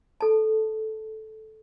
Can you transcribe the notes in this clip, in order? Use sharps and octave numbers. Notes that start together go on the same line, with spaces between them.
A4 A5